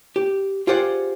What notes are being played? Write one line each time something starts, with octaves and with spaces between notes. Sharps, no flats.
G4
F4 G4 G#4 C5 D5 F#5